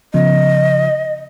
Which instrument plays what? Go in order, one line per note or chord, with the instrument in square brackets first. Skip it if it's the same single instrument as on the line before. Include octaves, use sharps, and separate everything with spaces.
[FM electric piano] C#3 F3 B3 [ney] D#5